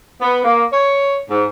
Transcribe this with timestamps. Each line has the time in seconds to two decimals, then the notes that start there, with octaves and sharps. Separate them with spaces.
0.22 B3
0.44 A#3
0.73 C#5
1.30 G#2